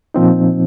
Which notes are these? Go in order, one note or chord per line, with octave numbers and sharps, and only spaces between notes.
A#2 F3 C4 D#4